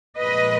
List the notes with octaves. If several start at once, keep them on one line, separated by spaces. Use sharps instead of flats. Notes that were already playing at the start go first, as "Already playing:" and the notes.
A#2 F3 G#3 B4 D#5